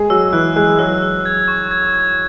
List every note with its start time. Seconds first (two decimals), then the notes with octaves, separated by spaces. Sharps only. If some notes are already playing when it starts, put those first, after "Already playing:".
Already playing: G#3 G#4
0.10 F#3 F#4 E6
0.32 E3 E4 F#6
0.56 G#3 G#4 F#6
0.78 F#3 F#4 E6
1.02 E6
1.25 G#6
1.48 C#6
1.71 G#6
1.94 G#6